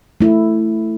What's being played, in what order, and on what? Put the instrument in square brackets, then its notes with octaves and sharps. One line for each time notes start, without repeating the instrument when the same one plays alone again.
[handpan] A3 E4